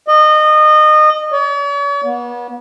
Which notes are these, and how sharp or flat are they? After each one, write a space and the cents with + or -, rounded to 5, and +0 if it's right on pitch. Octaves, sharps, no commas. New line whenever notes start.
D#5 -25
C#5 +45
B3 -35